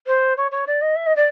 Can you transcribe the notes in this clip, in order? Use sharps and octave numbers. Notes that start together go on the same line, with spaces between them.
C5
C#5
C#5
D5
D#5
E5
D#5
D5